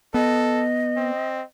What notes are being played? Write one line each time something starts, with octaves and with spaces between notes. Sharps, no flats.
B3 A4 D#5
C4